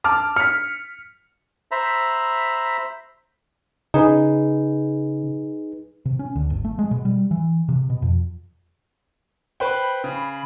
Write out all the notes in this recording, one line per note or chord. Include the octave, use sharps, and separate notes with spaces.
A5 D6 F6
F6 B6 C#7
C5 E5 A#5 B5
C#3 D#4 G#4 B4
C3
C#4
D2
G1
A3
G#3
B2
G3
E3
C3
B2
F2
B4 C5 G5 B5
C#3